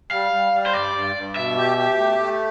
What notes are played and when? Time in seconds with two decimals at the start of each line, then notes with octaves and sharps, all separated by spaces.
0.11 G3 F5
0.32 G3
0.52 G3
0.66 C5
0.73 G2 D5
0.94 G2
1.16 G2
1.35 B2 E5
1.56 G4
1.78 G4
1.99 A3
2.18 A3